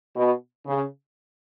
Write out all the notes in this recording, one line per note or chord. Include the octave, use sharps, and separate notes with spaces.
B2
C#3